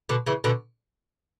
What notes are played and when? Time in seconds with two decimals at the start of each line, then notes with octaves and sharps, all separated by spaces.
0.09 B2 D3
0.26 C#3 E3
0.44 B2 D3